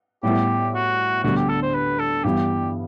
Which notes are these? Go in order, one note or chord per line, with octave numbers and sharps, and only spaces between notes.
A2 G3 B3 E4 G4
F#4
D2 D3 G3 B3 F#4
G4
A4
C5
B4
A4
G2 E3 G3 B3 G4